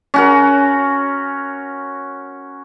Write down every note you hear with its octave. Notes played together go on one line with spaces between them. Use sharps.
C#4 F#4 A#4